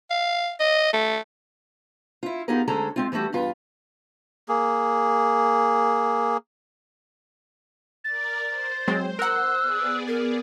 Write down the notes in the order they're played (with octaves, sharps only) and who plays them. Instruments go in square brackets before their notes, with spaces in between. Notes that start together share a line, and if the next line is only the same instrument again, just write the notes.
[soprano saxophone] F5
D#5
A3
[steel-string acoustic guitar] E4 F4
B3 D#4 F4 G4 G#4 A#4
D2 G#3 C#4 G#4 A4 A#5
G#3 C4 F4
E3 G3 A3 F#4 G4
E2 G2 F4 B4
[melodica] A#3 G#4
[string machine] A#4 D5 [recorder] A6
[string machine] C5
[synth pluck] F#3 G#3 C4 [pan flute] C#5
[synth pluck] A#4 F#5 [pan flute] E6 [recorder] F#6
[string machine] B3 G#4 D5
[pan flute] A#4